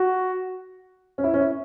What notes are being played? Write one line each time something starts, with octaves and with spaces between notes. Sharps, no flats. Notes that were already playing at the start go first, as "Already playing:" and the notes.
Already playing: F#4
C#4
E4
C#4
E4